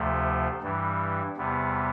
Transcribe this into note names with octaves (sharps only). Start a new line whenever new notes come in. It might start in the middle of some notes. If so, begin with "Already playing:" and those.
Already playing: D2 C3 F3 A3
G2 E3 G3
E2 C3 G3 B3